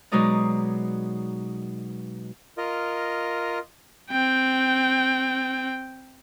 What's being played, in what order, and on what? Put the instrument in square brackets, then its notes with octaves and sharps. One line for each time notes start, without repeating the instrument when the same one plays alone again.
[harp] B2 F#3 G#3 D#4 D5 D#6
[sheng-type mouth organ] F4 A#4 D#5
[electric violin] C4 G5